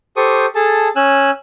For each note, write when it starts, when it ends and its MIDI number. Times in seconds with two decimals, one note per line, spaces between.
0.17 0.46 67
0.17 0.46 69
0.17 0.46 72
0.17 0.46 85
0.17 0.46 87
0.55 0.89 68
0.55 0.89 69
0.55 0.89 81
0.96 1.31 61
0.96 1.31 80
0.96 1.31 88
0.96 1.31 90